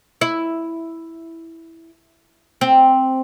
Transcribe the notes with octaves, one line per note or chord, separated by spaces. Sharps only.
E4
C4